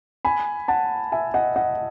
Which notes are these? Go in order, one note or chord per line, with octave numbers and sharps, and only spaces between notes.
G#5 B5
F#5 A5
E5 G#5
D#5 F#5
D#5 F#5